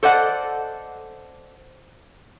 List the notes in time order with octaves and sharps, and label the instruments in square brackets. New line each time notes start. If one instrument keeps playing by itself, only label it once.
[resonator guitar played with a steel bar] A4 C5 D5 D#5 F#5